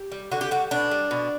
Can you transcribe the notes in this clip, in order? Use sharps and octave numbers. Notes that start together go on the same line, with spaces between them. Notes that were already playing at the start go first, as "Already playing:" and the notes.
Already playing: G4
G3
D3 F#4
G4
G3 F#4
B2 D4
G3
B2